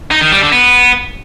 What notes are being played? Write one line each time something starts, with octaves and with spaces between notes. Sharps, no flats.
D#4
D#3
G3
D3
B3